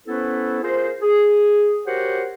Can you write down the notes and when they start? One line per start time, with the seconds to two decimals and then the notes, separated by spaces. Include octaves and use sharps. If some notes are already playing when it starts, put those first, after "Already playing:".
0.06 B3 C#4 E4 A4 B4 C5
0.63 F4 G#4 A#4 C5
1.02 G#4
1.87 F#4 G4 A#4 C5 C#5 F#5